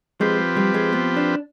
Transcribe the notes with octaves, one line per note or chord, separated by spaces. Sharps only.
F3 G#3 C4 G4 B4
G3
G#3
B3
D4